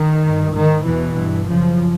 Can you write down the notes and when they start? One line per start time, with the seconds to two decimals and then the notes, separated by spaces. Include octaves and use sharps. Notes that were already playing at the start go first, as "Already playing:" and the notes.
Already playing: D#3
0.23 G2
0.53 G#2 D#3
0.85 E2 B2 E3
1.16 G2
1.48 F#2 C#3 F3